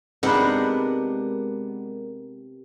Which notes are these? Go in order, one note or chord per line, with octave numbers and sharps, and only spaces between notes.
C3 G#3 B3 D4 D#4 A#4 C5 F#5